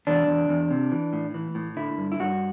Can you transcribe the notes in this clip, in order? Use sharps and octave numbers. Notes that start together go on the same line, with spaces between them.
E2 D4
E2
E2
C3
E3
A2
E3
A2
D3 E4
G2
E4
G2 F#4